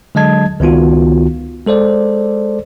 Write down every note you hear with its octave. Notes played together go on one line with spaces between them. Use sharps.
D3 F#3 G#3 D#5 A5 G#6
C#2 D#3 B3 F4 F#4
G#3 A4 C5 D5